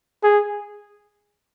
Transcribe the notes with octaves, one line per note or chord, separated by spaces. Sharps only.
G#4